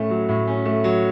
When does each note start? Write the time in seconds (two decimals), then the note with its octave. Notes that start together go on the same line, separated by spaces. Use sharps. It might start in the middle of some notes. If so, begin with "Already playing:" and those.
Already playing: A2 A3 C#4
0.10 F#3
0.29 A2
0.48 C#4
0.65 A3
0.84 F#3